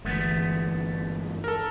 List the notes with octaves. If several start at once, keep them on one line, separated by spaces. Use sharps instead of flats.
G1 E3 G#3 A3 B3
A4 A#4